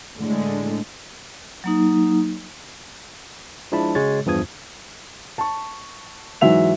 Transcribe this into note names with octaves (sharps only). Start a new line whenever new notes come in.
A2 D3 G#3
F#3 A#3 D#4
F3 G#3 D4 E4 A5 B5
C#3 G#3 F#4 C#5 A6
E2 G2 F3 D#6 G#6
A5 C#6
G#2 E3 F#3 E5 F7